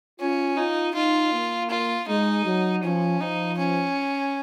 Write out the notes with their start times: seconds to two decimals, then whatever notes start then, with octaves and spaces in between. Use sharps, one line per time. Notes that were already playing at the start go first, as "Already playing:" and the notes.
0.20 C#4 F4
0.57 D#4 F4
0.95 D#4 F4
1.33 A#3
1.70 F4
2.08 G#3 D#4
2.45 F#3
2.83 F3 C#4
3.20 F3 D#4
3.58 C#4